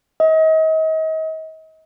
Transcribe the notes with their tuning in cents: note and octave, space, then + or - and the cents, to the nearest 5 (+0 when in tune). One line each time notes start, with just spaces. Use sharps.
D#5 +35